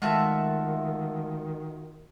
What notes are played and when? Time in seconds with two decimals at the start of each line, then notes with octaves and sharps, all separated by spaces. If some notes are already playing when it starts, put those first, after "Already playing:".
0.02 D#3 G#3 A3 F4 F#4 E5 A5